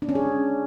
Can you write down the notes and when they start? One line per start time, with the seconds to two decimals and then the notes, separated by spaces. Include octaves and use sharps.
0.02 D4
0.09 C#4
0.15 G#4